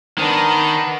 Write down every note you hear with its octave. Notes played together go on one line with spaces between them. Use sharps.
D#3 B3 D4